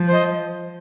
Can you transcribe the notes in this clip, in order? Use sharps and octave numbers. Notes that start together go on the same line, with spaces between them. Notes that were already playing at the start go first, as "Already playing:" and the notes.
Already playing: F3
C5 D#5